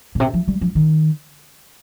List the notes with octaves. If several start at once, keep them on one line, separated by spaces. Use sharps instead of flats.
A#2
C3
F3
G3
F3
D#3